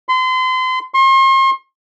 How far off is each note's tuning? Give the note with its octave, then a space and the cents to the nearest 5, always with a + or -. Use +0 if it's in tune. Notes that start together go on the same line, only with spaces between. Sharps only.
C6 -35
C6 +40